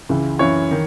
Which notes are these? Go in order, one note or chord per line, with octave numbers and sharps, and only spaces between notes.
C#2 C#3 E3
F#2 E3 C#5
D#3